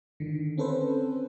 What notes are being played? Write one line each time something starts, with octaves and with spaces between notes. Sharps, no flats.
D3 D#3
C4 C#4 A4 B4 C5